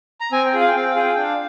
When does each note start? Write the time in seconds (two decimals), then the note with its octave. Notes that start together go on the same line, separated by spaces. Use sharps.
0.21 A#5
0.32 C4 G#5
0.46 G5
0.53 F4 G#4
0.60 F5
0.68 G5
0.75 C4 F5
0.83 G5
0.91 F5
0.95 F4 G#4 G5
1.07 F5
1.15 D4 G5
1.22 F5